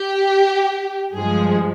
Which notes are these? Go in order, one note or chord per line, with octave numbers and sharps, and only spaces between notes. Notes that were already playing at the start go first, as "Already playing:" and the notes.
Already playing: G4
G2 F3 G#3 G#4